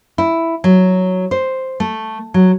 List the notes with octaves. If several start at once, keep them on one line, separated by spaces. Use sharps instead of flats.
E4
F#3
C5
A3
F#3